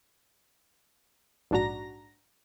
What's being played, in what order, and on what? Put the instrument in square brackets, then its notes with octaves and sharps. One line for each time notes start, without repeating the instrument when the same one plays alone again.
[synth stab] A#1 G#2 D4 F#4 A#5 A#6